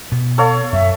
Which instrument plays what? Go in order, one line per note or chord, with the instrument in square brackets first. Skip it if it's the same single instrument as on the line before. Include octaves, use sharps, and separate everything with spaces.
[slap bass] B2 B3
[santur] A4 C#5 F5
[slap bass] F#2 [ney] E5